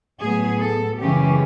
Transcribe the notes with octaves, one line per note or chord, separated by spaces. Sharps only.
A2 F#3 B3 G#4
A4
F#2 C#3 E3 G#3 C#4 G4